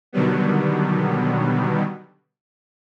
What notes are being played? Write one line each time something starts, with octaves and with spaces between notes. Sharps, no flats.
B2 D3 D#3 F#3 G3 B3